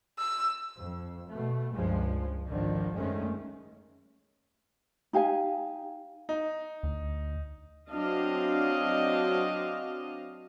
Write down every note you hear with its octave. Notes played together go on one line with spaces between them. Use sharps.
E6
F2
B2 A3
C#2 G2 F3 G#3
G#1 D3 D#3 F3
F#2 D#3 G#3 A3 C4 C#4
D#4 G4 F5 G#5
D#4
D2
F#3 C4 D4 F#4 D#5 F5